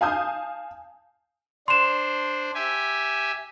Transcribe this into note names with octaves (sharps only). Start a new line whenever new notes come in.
F5 G#5 A5 D#6 G6
D4 C5 C6 E7
G4 E5 G#5